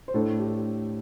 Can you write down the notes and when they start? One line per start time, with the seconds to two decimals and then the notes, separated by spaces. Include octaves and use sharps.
0.08 C5
0.14 A2 A3 D4 A4
0.39 G4